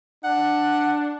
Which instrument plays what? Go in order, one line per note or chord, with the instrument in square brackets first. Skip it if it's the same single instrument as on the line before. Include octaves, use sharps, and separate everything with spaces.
[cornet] D4 [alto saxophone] F#5